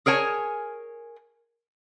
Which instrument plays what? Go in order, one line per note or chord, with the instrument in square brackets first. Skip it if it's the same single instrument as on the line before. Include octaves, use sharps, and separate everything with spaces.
[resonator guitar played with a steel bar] G#4 A#4 C#5 G#5